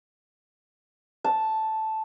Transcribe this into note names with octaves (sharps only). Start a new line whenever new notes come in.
A5